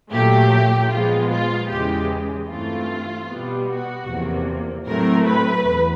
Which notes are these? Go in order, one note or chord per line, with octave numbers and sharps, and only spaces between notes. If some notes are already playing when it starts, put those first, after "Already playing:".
A#2 F#3 A3 G4
A#2 F3 G#3 B3 F4
F4
E2 C#3 E3 G#3 G4
G2 E3 A3 C4 F4
B2 G3 B3
F#4
E2 C3 F3 A#3
A2 F#3 A3 C4 A#4
B4
E2